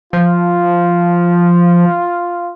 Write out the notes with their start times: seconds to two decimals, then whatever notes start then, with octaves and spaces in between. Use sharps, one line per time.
0.13 F3 F4